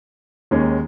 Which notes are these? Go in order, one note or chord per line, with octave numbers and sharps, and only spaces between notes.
D#2 D#3 G#3 C#4 G#4